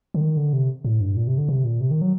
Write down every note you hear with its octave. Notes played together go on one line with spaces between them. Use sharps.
D3
D#3
D3
C3
A2
G2
A#2
C3
D3
C3
A#2
C3
D#3
F#3